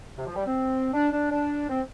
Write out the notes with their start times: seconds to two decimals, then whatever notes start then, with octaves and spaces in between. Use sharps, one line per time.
0.18 C3
0.27 F3
0.36 G3
0.47 C4
0.94 D4
1.12 D4
1.32 D4
1.70 C4